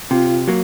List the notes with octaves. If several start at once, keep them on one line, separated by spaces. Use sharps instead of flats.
C3 F4
F#3 A#3